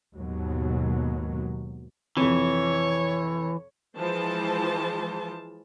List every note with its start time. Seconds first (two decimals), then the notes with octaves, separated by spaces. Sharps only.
0.16 D#2 G#2 B2 F#3
2.17 F2 C3 E3 C#5
3.97 E3 F3 G#3 C5 A5